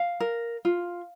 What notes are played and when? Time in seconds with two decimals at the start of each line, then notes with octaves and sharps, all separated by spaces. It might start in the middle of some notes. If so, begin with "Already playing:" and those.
Already playing: F5
0.20 A#4
0.65 F4